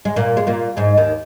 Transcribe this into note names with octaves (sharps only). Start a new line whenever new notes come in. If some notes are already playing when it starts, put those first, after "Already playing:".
G#3
A#2 A#3
G#3
A#2 A#3
G#2 G#3
D#2 D#3